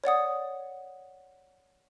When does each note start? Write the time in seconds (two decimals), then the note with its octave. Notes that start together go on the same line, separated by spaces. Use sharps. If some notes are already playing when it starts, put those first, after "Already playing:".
0.04 C#5 D5 F#5 D#6